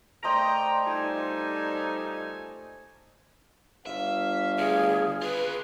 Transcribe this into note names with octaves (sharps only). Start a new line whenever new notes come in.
A3 C5 D5 D#5 G5 A#5
F3 G3 D#4 A4 G#5
G1 E5 F5
D2 G#4
F4 G#4 B4